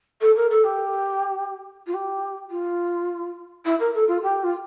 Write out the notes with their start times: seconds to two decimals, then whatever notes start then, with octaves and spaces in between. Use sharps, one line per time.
0.21 A4
0.36 A#4
0.51 A4
0.64 G4
1.87 F4
1.94 G4
2.51 F4
3.65 E4
3.80 A#4
3.94 A4
4.08 F4
4.23 G4
4.44 F4